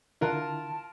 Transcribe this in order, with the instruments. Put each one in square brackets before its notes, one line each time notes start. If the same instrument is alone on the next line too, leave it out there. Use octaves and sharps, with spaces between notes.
[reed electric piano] D3 E4 [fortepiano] F4 A#4 F#6 [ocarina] A5
[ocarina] A5